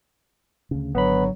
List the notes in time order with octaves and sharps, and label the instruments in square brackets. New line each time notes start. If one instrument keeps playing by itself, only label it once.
[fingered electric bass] D2 C#3
[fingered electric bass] G#1 D3 [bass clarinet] F#3 [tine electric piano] B3 B4 B5